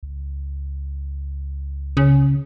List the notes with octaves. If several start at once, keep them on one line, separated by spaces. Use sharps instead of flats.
C#2
C#3